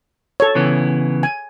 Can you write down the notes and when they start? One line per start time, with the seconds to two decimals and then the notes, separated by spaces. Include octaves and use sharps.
0.40 A4 C#5
0.55 C#3 E3 B3
1.23 G#5